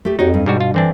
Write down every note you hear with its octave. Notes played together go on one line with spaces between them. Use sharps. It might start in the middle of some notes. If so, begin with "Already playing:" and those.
A3 G4
F2 D#4 F#4 G4 C#5
G2
G#2 B2 G3 F#4
F4
D3 E3 C4 D4